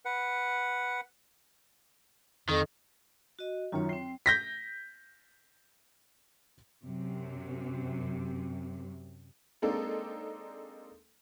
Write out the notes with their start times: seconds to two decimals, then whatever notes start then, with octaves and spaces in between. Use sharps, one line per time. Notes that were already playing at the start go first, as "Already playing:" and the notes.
0.05 B4 F#5
2.49 F2 D#3
3.39 F#4 D#5
3.72 F#2 D#3 F4 C#5
3.89 C4 G5 C7
4.26 G6 A#6 B6
6.85 F#2 C3
9.62 G#3 A#3 C4 D4 D#4 A4